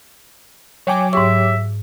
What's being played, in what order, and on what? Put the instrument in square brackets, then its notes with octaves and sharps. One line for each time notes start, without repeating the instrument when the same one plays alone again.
[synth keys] F#3 D6 [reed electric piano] C#5 G5 G#5
[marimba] G#2 C#6 [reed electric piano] G4 C#5 [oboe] E5